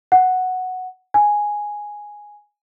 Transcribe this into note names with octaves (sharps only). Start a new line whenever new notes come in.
F#5
G#5